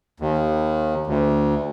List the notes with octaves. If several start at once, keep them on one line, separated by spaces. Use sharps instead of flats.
D#2
D2